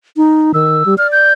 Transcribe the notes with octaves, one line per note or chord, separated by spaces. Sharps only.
D#4
D#3 E6
G3
D5 F6
G6